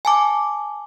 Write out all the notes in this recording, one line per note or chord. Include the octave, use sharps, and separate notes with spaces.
G#5 A5 D6